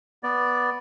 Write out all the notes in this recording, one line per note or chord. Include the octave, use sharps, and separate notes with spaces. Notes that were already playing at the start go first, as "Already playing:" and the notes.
B3 D5